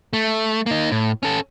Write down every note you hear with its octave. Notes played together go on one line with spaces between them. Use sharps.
A3
A#3 D#4
A2
C#4 A4